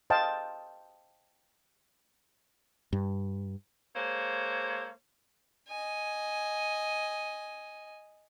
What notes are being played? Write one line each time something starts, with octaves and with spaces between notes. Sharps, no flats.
C5 D#5 F5 G5 A5
G2
G#3 A#3 A4 C5 C#5 F5
D#5 G#5